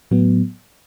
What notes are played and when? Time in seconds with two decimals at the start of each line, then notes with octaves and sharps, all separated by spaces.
0.11 A2 F#3 B3